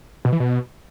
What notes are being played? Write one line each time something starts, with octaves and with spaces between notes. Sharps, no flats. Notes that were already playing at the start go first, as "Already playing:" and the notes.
B2
E3
B2